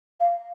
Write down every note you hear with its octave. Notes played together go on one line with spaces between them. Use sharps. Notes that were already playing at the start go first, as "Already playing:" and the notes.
F5